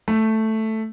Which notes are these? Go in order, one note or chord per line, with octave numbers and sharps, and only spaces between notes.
A3